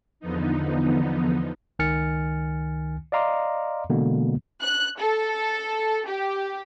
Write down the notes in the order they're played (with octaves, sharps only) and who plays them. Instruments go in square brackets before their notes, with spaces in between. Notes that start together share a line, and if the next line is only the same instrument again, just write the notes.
[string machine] E2 D3 F3 B3 D#4
[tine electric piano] C#2 D#3 G#5 F6 A6 C#7
D5 D#5 F5 A#5 C6 D6
B2 D3 E3 G#3 A#3 B3
[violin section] F#6
A4
G4